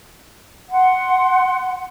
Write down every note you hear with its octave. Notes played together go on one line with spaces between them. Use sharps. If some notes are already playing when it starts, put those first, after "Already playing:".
F#5 C6